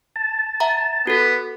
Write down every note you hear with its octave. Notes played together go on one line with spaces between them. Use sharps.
A5
E5 F#5 A#5
B3 F#4 A4